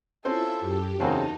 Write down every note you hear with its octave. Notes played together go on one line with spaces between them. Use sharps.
C4 C#4 E4 F4 A4 C5 E5
F#2 G4
E2 C#3 A#3 C4 D#4 F#4 A5